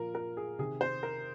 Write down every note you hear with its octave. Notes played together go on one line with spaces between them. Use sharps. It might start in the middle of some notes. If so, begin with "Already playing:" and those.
Already playing: A#2 F3 A#4
A#4
G#4
C3 D#3 G#4
C5
A#4